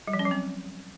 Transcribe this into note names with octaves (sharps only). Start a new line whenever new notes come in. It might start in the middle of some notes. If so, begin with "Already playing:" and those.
G3
F3
C#4
F#3
C4